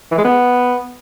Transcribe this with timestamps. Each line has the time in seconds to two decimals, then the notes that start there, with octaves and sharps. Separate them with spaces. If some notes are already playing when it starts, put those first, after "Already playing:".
0.12 E3
0.18 G#3
0.24 B3